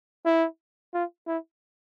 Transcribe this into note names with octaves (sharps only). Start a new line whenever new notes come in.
E4
F4
E4